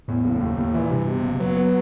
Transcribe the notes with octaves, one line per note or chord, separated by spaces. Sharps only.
E2 A2
F#1
D#2
D#2
A#2 E3
G2 C3
B2
F#1
F#3 B3
B3